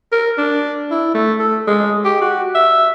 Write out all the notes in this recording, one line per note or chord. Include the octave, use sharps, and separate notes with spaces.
A#4
D4
E4
A3
A4
G#3
G4
F#4
E5